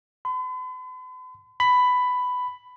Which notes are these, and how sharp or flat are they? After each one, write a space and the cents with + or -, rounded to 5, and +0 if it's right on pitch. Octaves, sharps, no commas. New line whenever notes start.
B5 +45
B5 +10